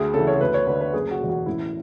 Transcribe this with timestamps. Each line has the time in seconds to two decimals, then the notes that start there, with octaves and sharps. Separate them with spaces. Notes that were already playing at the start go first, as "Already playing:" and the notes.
Already playing: D2 G#4
0.14 C#3 E3 A4
0.27 C#5
0.35 A4
0.41 D2 B4
0.54 C#5
0.67 D3 B4
0.81 B4
0.93 F#1 G#4
1.11 F#4
1.20 E2 B2
1.29 F#4
1.46 A1 E4